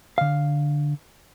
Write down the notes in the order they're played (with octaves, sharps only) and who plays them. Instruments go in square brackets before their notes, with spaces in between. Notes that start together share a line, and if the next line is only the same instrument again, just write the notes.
[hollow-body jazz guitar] D3 F5